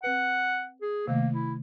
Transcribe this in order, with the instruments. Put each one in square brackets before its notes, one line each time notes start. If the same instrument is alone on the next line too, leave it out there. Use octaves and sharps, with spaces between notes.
[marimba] C4 B4 [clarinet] F#5
[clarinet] G#4
[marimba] C3 D#3 A3 [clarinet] A#3
[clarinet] E4